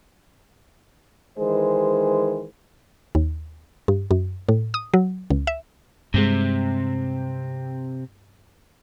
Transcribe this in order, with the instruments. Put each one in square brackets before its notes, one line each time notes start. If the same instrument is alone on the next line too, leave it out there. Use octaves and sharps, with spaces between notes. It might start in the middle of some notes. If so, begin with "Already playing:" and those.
[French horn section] D#3 E3 G#3 C5
[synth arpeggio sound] D#2
G2
F#2
A2
D#6
F#3
C#2
E5
[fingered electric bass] G2 G#3 [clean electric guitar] C3 C4